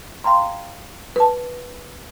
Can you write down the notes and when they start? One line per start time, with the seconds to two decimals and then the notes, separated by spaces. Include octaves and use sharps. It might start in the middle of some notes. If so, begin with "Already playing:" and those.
0.24 F5 G5 A#5 C6
1.16 B4 A5